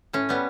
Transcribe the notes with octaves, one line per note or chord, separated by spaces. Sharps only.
A2 C#4
G3 B3